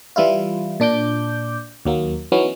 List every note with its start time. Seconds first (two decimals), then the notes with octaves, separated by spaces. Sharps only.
0.16 E3 G3 E4 F4
0.80 A#2 D4 D6 G6
1.85 D#2 F#3 A#3
2.32 E3 F#3 B3 C#4 D#4